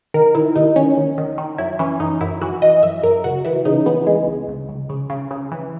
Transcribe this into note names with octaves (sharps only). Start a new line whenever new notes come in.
D#3 A#4
D#3 E4
D#2 D#4
D#3 C#4
D#2
D#3
D#3
F#2 E4
E3 C#4
F#2 D#4
F#2 E4
E3 F#4
E3 D#5
F#2 E5
F#2 A#4
C#2 F#4
E3 E4
C#3 D#4
E3 B3
C#2 G#3
C#2
C#2
C#2
C#3
C#3
C#3
E3